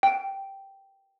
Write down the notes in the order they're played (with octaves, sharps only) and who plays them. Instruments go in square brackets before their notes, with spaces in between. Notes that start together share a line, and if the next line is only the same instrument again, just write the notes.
[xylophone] G5